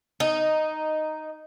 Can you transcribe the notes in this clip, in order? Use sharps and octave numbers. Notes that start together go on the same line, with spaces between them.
D#4